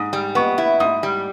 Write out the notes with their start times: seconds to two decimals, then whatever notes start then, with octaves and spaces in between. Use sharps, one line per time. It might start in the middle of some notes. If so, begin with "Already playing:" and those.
Already playing: G#2 D#6
0.13 G3
0.35 B3 C#6
0.58 E4
0.80 G#2 D#6
1.03 G3